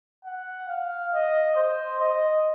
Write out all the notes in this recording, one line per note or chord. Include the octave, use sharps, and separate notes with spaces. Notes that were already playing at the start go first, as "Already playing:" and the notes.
F#5
F5
D#5
C5
D#5